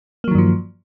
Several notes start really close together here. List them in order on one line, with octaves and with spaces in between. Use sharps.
A#3 F#3 D#3 G2 F3